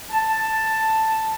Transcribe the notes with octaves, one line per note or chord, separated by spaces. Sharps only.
A5